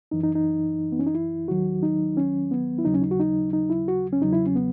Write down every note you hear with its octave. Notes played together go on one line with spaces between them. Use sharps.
F#2 E3 D#4
D#4
D#4
B3
C#4
D#4
E4
D#2 D#3 F#3 F#4
D#4
C#4
B3
E4
D#2 C#3 F#3 D#4
C#4
D#4
F#4
D#4
D#4
E4
F#4
C#4
E2 C#3 F#3 D#4
E4
C#4
B3